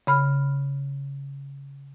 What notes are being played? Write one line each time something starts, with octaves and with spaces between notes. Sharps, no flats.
C#3 B5 F6